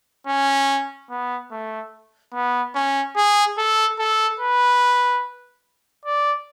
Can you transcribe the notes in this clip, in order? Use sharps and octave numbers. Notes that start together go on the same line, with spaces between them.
C#4
B3
A3
B3
C#4
G#4
A4
A4
B4
D5